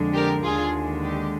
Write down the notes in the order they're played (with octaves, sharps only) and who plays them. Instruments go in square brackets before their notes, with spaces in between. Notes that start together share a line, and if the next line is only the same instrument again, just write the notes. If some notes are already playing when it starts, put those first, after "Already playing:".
Already playing: [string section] F2 D3 G#3
G4 A#4
D#2 D3 G#3 F4 G#4
G4